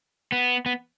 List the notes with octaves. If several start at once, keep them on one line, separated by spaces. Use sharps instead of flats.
B3
B3